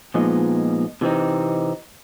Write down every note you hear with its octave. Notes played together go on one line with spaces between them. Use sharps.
A#2 F3 G#3 B3 D#4
C3 E3 G#3 C4 D#4